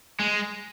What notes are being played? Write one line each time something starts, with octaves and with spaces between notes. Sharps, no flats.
G#3